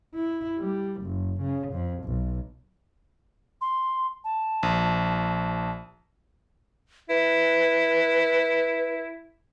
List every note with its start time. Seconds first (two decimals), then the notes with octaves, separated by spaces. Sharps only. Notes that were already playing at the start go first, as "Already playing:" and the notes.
0.15 E4
0.58 G3
1.01 F#1
1.41 C#3
1.73 F2
2.04 B1
3.61 C6
4.24 A5
4.63 A#1
7.09 E4 B4